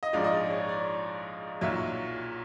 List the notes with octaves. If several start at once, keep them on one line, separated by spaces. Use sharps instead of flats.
D#5
A#1 G#2 F3 D5
D#5
D5
C#5
D5
B1 A#2 F#3 E5